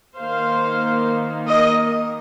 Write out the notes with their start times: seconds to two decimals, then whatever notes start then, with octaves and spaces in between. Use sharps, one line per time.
0.17 D#3 A#3 C5 F5
1.47 A#4 D#5